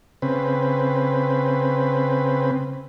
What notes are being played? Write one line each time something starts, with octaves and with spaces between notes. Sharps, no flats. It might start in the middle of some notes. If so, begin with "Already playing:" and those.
C#3 C4 B4